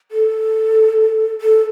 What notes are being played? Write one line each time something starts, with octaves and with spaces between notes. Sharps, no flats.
A4
A4